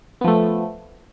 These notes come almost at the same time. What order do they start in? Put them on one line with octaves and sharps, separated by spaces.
B3 F3 A3